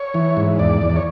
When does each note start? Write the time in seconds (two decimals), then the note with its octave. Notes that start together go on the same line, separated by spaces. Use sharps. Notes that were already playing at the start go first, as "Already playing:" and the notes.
Already playing: C#5
0.14 E3
0.37 G#2
0.59 E2 D5
0.82 E2
0.89 D5
0.96 C#5